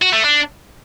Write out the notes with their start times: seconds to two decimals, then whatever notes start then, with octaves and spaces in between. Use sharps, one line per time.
0.02 F#4
0.13 A3
0.24 D4